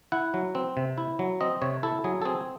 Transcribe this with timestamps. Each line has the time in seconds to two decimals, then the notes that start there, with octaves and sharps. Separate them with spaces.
0.12 E4 F#5
0.34 F#3
0.55 C4
0.77 C3
0.98 E4
1.19 F#3
1.41 C4 D#5
1.62 C3 C#5
1.83 E4 A4
2.04 F#3 G#4
2.22 A4
2.25 C4 G#4